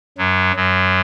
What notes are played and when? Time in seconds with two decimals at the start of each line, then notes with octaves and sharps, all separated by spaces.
0.18 F#2 F#3
0.56 F#2 F#3